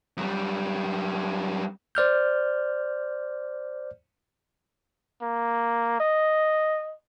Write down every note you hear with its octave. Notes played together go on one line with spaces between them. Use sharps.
F#2 G3
C5 D5 F6 G6
A#3
D#5